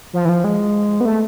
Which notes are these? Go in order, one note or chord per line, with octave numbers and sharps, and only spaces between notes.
F3
E3
F3
G#3
B3
A3